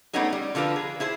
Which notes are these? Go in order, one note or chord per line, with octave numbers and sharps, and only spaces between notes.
G3 A3 B3 C#4 D#4 G#4
G3
D3 F3 F4 A#4 B4
G#4
E4 G#4 C5